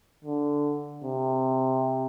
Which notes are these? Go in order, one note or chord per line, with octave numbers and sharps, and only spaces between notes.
D3
C3